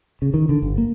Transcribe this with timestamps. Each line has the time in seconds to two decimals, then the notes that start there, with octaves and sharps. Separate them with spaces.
0.22 C#3
0.34 D#3
0.49 D3
0.62 G1
0.78 A#3